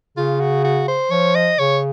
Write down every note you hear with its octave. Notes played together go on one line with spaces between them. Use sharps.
C#3 F4
F#4
F#4
C5
F3 C#5
D#5
C#3 C#5